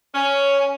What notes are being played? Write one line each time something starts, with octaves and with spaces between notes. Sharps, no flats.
C#4